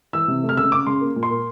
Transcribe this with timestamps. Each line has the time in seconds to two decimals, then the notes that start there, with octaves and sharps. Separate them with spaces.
0.13 E3 E6
0.28 C3
0.43 A3
0.49 F6
0.57 C#3 E6
0.72 C#3 D6
0.87 C#3 C6
1.01 A#3
1.16 A#2
1.23 C6
1.30 A#3